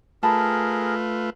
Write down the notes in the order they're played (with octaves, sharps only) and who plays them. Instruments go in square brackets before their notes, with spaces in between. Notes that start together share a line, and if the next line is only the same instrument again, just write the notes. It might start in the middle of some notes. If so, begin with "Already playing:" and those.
[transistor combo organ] A3 F4 B4 [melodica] G#4 A#4 [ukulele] A5 B5